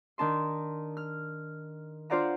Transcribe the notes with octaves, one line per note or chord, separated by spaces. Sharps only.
D#3 D4 A5 C6
F6
D4 F4 C5 D5 F#5 A#5